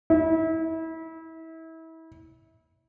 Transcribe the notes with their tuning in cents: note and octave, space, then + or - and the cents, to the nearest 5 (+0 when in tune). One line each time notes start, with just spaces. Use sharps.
E4 -30